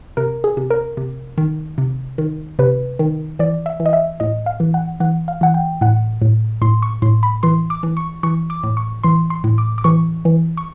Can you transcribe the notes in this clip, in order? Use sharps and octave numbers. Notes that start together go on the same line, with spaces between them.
C3 A#4
G#4
C3
A#4
C3
D#3
C3
D#3
C3 B4
D#3
E3 D5
E5
E3
D#5
E5
A2 D#5
F5
E3
F#5
E3 F#5
F5
E3 F#5
G5
A2 F#5
A2
A2 C6
C#6
A2 C6
B5
E3 C6
D6
E3
C#6
E3 C#6
D6
A2
C#6
E3 C6
C6
A2
D6
D6
E3 C#6
E3
C#6